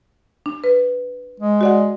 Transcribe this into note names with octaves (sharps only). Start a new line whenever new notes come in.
D4
B4
G#3
F#4 D5 F#5